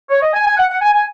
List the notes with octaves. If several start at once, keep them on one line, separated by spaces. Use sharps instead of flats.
C#5
D#5
G#5
G#5
F#5
F#5
G#5
G#5